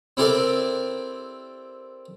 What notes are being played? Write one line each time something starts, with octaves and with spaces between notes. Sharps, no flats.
C4 E4 G4 A4 A#4 D5